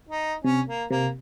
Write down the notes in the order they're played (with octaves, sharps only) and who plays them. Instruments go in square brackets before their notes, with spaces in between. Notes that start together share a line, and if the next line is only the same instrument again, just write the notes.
[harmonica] D#4
[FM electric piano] C3 [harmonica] C#4
[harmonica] A#3
[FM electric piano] C3 [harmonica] A#3